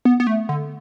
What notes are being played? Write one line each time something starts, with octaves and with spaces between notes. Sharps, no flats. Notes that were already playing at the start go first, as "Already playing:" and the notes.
B3
B3
A3
D3